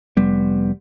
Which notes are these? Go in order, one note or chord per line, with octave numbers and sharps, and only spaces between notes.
F1 G3 B3